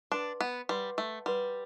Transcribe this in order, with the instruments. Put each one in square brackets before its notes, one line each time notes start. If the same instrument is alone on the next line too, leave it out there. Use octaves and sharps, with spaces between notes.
[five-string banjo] D4 [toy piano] B4 F#5 C6
[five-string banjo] B3
[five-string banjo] G3 [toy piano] B4 F#5 C6
[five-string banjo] A3
[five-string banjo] G3 [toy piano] B4 F#5 C6